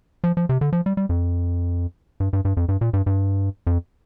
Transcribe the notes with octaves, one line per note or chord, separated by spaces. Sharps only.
F3
F3
C3
D3
F3
G3
G3
F2
G2
G2
G2
F2
G2
A#2
G2
G2
F2